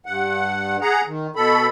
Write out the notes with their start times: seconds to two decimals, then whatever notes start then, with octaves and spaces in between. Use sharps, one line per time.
0.06 G2 F#5
0.81 G#4 F#5 A#5
1.07 D#3
1.36 B2 A4 B5